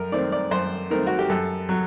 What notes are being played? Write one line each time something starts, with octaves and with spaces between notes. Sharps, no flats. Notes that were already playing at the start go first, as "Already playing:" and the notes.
Already playing: F#2 A#4
D#3 A3 C4 D5
D5
F#2 C5
D#3 A3 C4 A#4
F#4
G4
F#2 A4
F#3